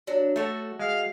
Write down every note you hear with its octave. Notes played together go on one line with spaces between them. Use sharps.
F#3 D4
A3 F#4 A4 C#5 E5
G#3 F5